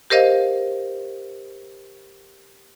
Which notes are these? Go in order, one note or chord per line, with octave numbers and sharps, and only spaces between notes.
G4 A#4 C5 D#5 F5